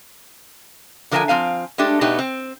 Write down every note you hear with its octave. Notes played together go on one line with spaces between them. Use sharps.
D3 F3 A#4 B4 E5 G#5
F3 C4 F5 G#5
G#3 A3 D4 G4
B2 A3 D4 D#4 G4 B4
C4